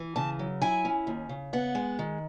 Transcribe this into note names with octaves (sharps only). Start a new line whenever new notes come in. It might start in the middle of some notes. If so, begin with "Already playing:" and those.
Already playing: E3
C#3 A5
F#3
E4 G#5
C#4
D#2
C#3
B3 F#5
G#3
D#3